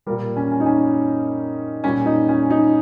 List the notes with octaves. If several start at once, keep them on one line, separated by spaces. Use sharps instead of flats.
A#2 G3 A#4
C#4
C#4
D#4
C#4
A#2 G3 C#4
D#4
C#4
D#4